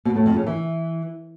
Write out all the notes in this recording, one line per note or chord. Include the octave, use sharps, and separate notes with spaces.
B2
A2
F2
C#3
E3